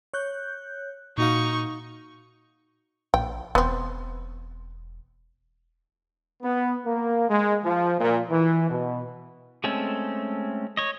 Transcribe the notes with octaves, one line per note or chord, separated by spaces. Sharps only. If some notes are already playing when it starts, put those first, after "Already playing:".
C#5 F#6 G6
A#2 D#4 F#4 F5 C#6
A#1 G5
E1 B3 C4
B3
A#3
G#3
F3
A#2
E3
B2
G#3 A3 C4 C#4 A4
C#5 D#5